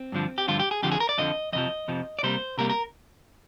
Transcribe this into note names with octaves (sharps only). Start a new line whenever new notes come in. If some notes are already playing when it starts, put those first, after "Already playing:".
Already playing: C4
G2 D3 F3
G4
G2 D3 F3 F4
G4
G#4
F2 D3 F3 G4
G#4
A#4
D5
F2 D3 F3 D#5
F2 C3 F3 D#5
F2 C3 F3
D5
C3 G3 A#3 C5
C3 G3 A#3 A#4
A#4